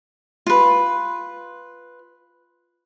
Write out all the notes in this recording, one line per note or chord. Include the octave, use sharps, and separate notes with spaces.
F4 B4